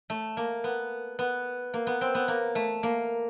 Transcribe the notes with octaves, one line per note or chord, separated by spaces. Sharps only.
A3
A#3
B3
B3
A#3
B3
C4
B3
A#3
A3
A#3